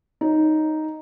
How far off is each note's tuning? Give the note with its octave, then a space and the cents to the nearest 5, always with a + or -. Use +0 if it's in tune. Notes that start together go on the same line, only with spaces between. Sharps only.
D#4 +0 C#5 +0